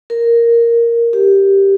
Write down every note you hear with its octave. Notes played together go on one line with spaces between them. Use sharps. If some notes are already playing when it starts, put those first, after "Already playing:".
A#4
G4